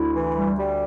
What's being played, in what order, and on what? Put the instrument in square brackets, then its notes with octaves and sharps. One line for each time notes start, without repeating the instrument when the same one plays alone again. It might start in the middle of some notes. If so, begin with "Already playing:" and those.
Already playing: [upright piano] D2 D3 [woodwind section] E4
[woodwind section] E3
G3
G3